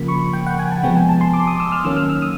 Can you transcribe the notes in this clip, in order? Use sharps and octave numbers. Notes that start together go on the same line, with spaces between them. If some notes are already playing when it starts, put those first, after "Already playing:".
Already playing: C#3 F3 A#3 B5
C#6
G5
F#5
G#5
A5
C3 F3 G#3 B3 G5
G#5
A5
C6
D6
D#6
E6
F6
D#3 F#3 A#3 C#4 E6
F6
E6
D#6